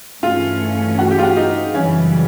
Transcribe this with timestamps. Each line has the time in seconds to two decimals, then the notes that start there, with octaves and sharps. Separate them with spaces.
0.23 G2 E3 A3 C#4 F4
0.99 F#4
1.11 G4
1.18 F4
1.23 F#4
1.36 D#4
1.74 F#2 C#3 E3 G3 C#4